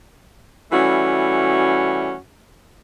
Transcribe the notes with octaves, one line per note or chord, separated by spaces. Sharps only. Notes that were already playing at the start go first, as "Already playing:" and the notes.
E3 G3 A3 C#4 F#4